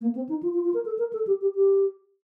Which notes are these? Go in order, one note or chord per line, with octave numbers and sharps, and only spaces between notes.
A#3
C4
D#4
F4
F4
F4
A#4
A4
A#4
A4
G4
G4
G4